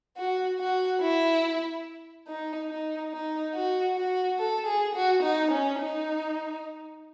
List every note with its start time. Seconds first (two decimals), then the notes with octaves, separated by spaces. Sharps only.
0.17 F#4
0.59 F#4
1.02 E4
2.28 D#4
2.70 D#4
3.13 D#4
3.54 F#4
3.97 F#4
4.39 A4
4.67 G#4
4.95 F#4
5.23 D#4
5.51 C#4
5.79 D#4